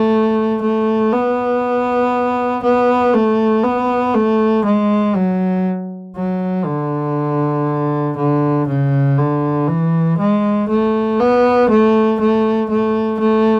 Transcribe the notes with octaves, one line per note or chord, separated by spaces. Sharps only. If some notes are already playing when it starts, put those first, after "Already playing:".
Already playing: A3
A3
B3
B3
A3
B3
A3
G#3
F#3
F#3
D3
D3
C#3
D3
E3
G#3
A3
B3
A3
A3
A3
A3